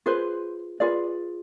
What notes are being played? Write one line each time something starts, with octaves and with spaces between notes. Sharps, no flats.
F4 G#4 B4 C5
F4 G#4 B4 D5